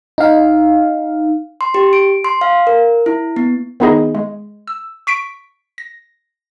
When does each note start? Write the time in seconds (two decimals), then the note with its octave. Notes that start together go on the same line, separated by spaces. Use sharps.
0.18 D#4 F5
1.61 C6
1.74 G4
1.93 D7
2.24 C6
2.41 F5
2.67 A#4
3.06 E4
3.36 B3
3.80 D#3 B3 D#4 E4 G#4 D#5
4.15 G#3
4.67 E6
5.07 C#6 B6 D7
5.78 A#6